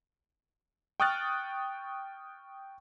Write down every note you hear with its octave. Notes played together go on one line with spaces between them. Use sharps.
G5 C#6 D#6 F6 F#6 A6